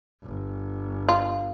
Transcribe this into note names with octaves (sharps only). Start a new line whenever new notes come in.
G1
F4